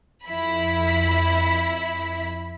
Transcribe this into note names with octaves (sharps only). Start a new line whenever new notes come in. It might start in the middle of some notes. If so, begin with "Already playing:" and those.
F2 E4 B5